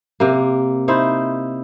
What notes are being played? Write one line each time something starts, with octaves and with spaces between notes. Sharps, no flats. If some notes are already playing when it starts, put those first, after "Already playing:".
C3 A#3
D#4 E4 C5